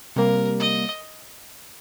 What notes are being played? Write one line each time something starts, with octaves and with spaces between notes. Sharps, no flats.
C3 G3 A#3 A#4
D#5